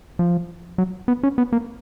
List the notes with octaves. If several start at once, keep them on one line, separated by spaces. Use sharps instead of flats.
F3
F#3
B3
C#4
B3
A#3